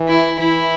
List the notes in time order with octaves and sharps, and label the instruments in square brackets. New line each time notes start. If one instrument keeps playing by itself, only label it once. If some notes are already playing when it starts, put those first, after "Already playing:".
Already playing: [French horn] E3
[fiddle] E4
[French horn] E3 [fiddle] E4